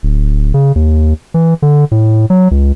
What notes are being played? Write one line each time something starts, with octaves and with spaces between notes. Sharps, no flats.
D1
C#3
D#2
E3
D3
A2
F#3
C#2